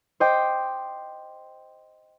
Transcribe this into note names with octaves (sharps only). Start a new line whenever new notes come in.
C5 D#5 G5 D6